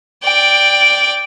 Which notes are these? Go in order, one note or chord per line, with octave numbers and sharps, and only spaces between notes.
D5 G5